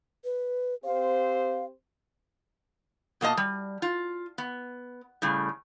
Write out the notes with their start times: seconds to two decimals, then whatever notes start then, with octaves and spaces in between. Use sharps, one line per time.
0.24 B4
0.85 C4 G4 C5 F5
3.21 B2 A#3 F4 D#5 A5
3.37 G3
3.82 F4
4.38 B3
5.22 A2 C#3 G3